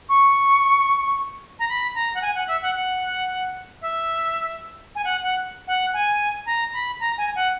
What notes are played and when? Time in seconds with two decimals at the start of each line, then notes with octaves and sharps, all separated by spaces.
0.09 C#6
1.59 A#5
1.68 B5
1.94 A#5
2.14 F#5
2.21 G#5
2.34 F#5
2.47 E5
2.61 F#5
2.75 F#5
3.81 E5
4.95 G#5
5.04 F#5
5.22 F#5
5.67 F#5
5.93 G#5
6.45 A#5
6.72 B5
6.99 A#5
7.17 G#5
7.35 F#5